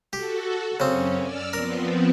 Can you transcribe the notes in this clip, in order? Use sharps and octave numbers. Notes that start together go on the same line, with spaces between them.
F#4 G4 A4
F#2 C#3 C4 C#4
D5 E6 F6
F3 B3 C4 A#4